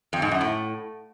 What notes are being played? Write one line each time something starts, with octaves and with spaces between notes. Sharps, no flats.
F2
G#2
F#2
A2